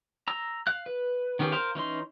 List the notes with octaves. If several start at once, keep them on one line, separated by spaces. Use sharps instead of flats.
A#5 E6
F5 F#6
B4
D#3 B3 C#4 G4 G#4
A#4 C5 F5
E3 C#4 D#4 C6